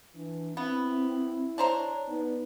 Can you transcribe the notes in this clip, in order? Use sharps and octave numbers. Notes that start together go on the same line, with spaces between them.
E3 D4
B3 C4 E4
D4 C5 C#5 A#5
B3 D#4